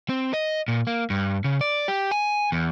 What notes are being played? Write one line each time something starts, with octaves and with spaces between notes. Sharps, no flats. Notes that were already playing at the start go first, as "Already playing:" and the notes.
C4
D#5
A#2
A#3
G2
C#3
D5
G4
G#5
E2